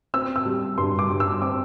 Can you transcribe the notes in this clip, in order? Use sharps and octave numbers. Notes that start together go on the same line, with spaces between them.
C4 E6
E6
G3
G2 C6
D6
G2
E6
C4 D6